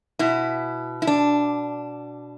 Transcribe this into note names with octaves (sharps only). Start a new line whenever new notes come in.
B2 E4
E4
D4